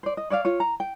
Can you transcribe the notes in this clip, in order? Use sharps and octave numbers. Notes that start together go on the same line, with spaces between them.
C5 D5
D#5
C#5 D5 E5 F5
F4 C#5
A#5
G5